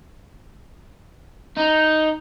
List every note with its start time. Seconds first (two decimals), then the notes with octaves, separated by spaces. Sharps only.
1.57 D#4